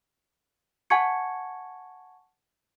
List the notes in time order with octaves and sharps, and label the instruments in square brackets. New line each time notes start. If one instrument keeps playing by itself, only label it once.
[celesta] F#5 G#5 A5 C#6 G#6 C#7